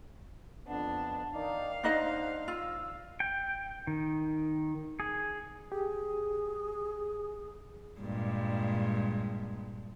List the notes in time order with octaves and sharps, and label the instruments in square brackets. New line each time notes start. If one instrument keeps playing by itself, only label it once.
[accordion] F2 B3 [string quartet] D4
[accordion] D#3 D#4 D5 [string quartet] F5
[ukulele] D4 D#4 D#5 [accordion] C5 F#5
[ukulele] F4 [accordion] E6
[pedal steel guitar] G5
D#3
G#4
[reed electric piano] G4 [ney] G#4
[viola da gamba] G2 A#2 G#3